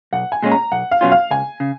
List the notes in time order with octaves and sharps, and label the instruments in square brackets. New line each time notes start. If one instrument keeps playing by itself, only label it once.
[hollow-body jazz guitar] B1 [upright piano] F#5
[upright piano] G#5
[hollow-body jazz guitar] A#2 G#3 C#4
[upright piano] A#5
[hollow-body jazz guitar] B1 [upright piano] F#5
[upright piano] F5
[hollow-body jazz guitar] B2 F#3 C#4 F4
[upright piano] F5
[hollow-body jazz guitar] C#2 [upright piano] G#5
[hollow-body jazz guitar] C#3